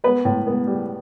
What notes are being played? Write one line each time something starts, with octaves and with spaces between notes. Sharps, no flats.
B3 B4
A2
B3
G3